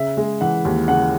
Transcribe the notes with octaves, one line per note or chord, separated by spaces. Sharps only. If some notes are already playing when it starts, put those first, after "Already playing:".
Already playing: C#3 E5
G#3
E3 F#5
D#2
C#3 F#5